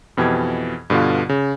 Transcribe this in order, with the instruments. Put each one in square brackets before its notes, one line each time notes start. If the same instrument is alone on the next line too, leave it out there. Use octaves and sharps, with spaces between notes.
[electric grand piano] F2 B2 E3 G4 G#6
G2 B2 D3 D4 F4
C#3